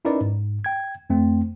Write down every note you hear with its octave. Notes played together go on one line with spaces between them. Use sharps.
C#4 D#4 E4 A#4 B4 D5
G#2
G5 G#6
F2 A3 C4